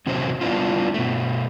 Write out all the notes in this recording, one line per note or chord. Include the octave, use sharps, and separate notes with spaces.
E2 C3 F#3 C#4 C5
G3 B3 D4 E4 F4
B2 A3